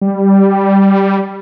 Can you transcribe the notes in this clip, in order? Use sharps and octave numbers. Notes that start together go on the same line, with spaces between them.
G3